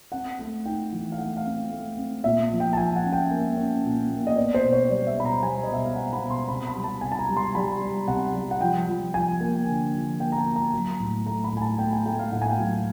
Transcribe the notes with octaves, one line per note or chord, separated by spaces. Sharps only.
C4 F#5
A3
D#4 G5
E3
F5
A3 F#5
F5
C4
A3
C4
A#2 E5
F3
G5
A5
F3 G#5
F#5
C#4
G5
A#3
C#4
A#2
A#3
D#5
B3 D5
C5
B2
C#5
G3 D5
E5
B2 B5
A#5
G3 G#5
D#5
B2 E5
F5
B3 F#5
B5
B2
C6
C3 B5
B5
G3
A5
C3 G#5
A5
A#5
G3
C6
G3 B5
G3
C3 F#5
G3
F#5
F3 G5
F3
F3 G#5
A#3
D3
F3
A#3 G5
A#5
A5
A#3
A#5
F#3
A2
A3 A#5
B5
A2 G#5
A5
A3 G5
G#5
A3 G5
F5
A2 F#5
G#5
G5
F#3